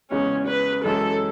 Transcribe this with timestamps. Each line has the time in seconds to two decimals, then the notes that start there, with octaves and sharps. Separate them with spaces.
0.11 E2 C#3 G#3 C#4
0.47 B4
0.84 F#2 E3 G#3 C#4 F#4 A4